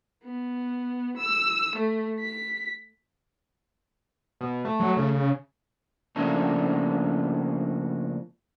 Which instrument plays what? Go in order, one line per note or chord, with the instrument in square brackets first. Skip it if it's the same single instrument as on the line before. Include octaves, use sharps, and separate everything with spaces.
[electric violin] B3
E6
A3
B6
[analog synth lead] B2
A3
[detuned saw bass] F#3
C#3
C#3
[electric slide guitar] C#3 F3 A3 A#3 D4